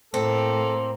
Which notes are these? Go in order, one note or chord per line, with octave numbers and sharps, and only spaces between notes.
A2 A#3 C4 A4